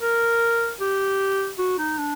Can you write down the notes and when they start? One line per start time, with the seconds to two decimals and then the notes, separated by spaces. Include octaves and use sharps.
0.01 A#4
0.80 G4
1.58 F#4
1.78 D#4
1.98 D4